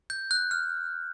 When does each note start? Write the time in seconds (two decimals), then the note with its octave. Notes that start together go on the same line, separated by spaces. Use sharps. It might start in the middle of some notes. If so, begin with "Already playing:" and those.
0.10 G6
0.31 F#6
0.51 F6